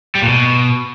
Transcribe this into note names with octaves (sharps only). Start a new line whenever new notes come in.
G3
A#2
B2